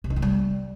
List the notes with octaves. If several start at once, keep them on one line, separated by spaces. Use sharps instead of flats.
C3
D#4
G#3
G3